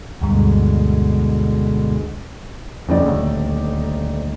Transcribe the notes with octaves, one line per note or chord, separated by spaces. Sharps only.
D2 G2 B2 D3 G#3
D#1 F2 C#3 D#4 D5
D2